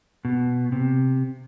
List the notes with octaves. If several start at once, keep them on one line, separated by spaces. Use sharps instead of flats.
B2
C3